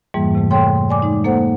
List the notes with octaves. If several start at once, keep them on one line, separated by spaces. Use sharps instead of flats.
F2 G#2 E3 G3 A#3
C3 A3
A4 C#5 G5 C6
D5 G#5 D6
G#3 D#4
A#3 A4 C5 F#5